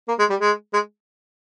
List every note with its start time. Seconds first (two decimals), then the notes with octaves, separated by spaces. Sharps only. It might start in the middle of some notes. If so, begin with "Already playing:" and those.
0.08 A#3
0.19 G#3
0.30 G3
0.41 G#3
0.73 G#3